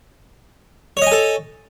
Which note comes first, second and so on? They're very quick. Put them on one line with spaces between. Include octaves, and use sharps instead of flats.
C#5 D#5 G#5 A4